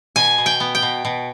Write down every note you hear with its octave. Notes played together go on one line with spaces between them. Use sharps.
B2 G#5
B2
G5
B3
G5
B2
B2